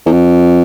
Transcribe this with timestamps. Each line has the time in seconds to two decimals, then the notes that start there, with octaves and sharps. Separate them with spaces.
0.06 E2
0.11 F2